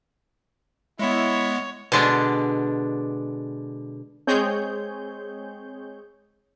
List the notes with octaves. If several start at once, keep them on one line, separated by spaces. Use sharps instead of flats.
G#3 B3 E4 C#5
B2 D3 G#3 D4
G#3 C4 G#4 C#5 G6